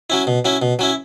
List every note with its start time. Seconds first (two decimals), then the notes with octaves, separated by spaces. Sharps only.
0.10 F#3 C#4 E4
0.27 B2
0.45 F#3 C#4 E4
0.62 B2
0.79 F#3 C#4 E4